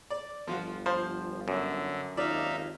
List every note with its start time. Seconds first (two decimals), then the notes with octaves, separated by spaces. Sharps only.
0.10 D5
0.47 G1 F3 F4 F#4
0.86 F3 C5
1.48 F#2 D3
2.17 G#1 D#2 D#4 F4 D5 E5 F5